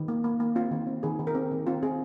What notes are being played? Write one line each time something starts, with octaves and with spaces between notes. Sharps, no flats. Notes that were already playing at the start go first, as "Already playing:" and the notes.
Already playing: D#3
A#3
A#3
A#3
C4 F4
D#3
C4
D#3 G#4
D#3
A#4
C4
D#3
C4 F4
C4 G#4